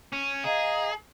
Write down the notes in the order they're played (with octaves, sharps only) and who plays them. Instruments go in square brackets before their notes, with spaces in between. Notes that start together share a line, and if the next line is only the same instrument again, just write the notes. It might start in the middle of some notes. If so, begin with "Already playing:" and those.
[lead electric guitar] C#4
[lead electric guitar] G#4 [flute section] D#5 F5 A#5